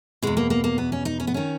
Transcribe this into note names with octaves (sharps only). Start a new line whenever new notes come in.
E2 B2 G#3
A#3
A#3
A#3
B3
C#4
D#4
C#4
B3
D#3 C#4